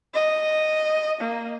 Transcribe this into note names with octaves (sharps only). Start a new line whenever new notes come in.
D#5
A#3